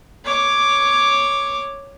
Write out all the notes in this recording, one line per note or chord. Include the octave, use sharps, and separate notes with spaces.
C#5 D6